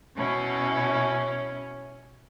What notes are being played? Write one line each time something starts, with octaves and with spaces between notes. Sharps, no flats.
B2 C#4 E4